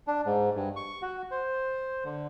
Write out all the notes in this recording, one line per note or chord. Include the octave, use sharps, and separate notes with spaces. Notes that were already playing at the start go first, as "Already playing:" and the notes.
D4
G#2
G2
C#6
F#4
C5
D3